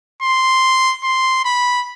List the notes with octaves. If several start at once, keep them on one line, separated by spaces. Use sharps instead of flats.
C6
C6
B5